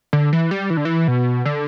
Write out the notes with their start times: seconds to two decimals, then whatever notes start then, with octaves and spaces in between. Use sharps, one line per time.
0.13 D3
0.33 E3
0.51 G3
0.70 E3
0.77 D3
0.85 E3
1.08 B2
1.46 D3